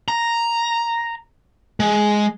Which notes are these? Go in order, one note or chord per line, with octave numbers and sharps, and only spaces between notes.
A#5
G#3